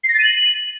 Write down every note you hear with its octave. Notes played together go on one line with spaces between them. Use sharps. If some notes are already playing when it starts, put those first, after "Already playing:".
C7
A#6
A6
D#7
F#7